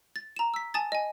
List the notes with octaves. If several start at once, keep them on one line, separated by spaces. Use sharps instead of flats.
A6
A#5 E7
E6 B6
G#5 A5 D#6 A6
D#5 G#5